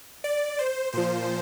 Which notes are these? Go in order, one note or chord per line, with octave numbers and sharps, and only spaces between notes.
D5
C5
A#2 F3 C5